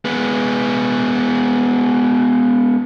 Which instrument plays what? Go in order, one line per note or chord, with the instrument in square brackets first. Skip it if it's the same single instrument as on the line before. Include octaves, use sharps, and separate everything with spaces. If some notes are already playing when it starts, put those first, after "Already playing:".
[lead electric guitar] G#3 B3